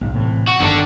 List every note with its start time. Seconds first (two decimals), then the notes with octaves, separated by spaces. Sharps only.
0.01 B1 G#2
0.14 A2 C3 E3
0.49 F#4
0.60 G1 G2 D3 D#3 D4